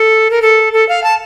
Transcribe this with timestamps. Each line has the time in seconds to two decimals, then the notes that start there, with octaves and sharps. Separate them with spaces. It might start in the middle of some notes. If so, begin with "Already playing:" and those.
Already playing: A4
0.31 A#4
0.42 A4
0.73 A4
0.89 F5
1.04 A5